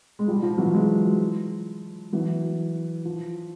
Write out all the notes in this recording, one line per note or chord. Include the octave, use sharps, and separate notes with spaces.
G#3
F3 G3
F3
E3 F#3
F#3 G#3
E3 F#3
F3